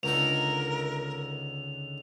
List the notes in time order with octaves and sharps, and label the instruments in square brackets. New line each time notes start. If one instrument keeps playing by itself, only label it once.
[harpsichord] C#2 D3 D#4 [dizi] A#4 [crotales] F7